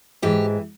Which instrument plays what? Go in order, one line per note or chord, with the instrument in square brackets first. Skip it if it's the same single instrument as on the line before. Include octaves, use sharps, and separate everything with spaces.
[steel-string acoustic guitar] G#2 E3 G4